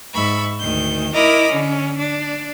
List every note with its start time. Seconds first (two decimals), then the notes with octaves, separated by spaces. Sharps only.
0.13 G#2 E5 B5 C#6
0.59 D2 D#3 G6
1.13 E4 A#4 D#5 A#5 B5 D6
1.48 D3 C#4
1.96 D4